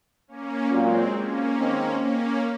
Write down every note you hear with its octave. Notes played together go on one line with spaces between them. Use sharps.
A#3 C#4
A#2 F#3 G#3 A#3 C4 F4
A#3 C#4
D#3 G#3 C4
A#3 C#4